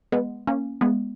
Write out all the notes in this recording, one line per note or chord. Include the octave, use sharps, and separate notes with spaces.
G#3 B3
A#3 C#4
G#3 B3